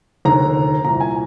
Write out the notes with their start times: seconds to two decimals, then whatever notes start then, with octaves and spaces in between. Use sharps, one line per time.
0.25 F1 D#2 D3 A#5
0.84 C2 A#2 A#5
1.00 G#5